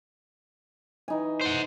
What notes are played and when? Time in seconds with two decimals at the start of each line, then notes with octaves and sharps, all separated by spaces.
1.08 E3 D#4 G#5
1.41 C5 F#5